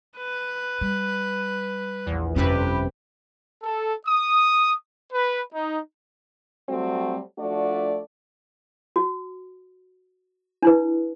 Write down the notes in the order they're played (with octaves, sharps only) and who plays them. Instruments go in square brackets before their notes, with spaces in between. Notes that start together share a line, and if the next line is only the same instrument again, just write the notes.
[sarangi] B4
[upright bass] G3
[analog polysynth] A#1 E2
[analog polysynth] G1 C3 B4 [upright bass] F2 C#4 [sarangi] G4
[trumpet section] A4
D#6
B4
D#4
[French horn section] F#3 G3 A3 C4 F#4
F3 A3 D4 F#4 D5
[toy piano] F#4
D4 E4 B4